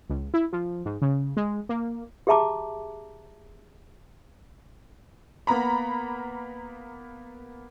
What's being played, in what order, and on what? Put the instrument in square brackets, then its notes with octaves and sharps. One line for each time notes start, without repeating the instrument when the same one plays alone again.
[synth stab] C#2
E4
F3
G#2
C#3
G#3
A#3
[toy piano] G4 G#4 E5 A5 A#5 D6
[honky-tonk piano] A#3 B3 A#5 B5